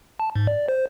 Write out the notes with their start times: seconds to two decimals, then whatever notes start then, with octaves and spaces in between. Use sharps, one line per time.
0.19 A5
0.35 G#2
0.47 D5
0.69 C5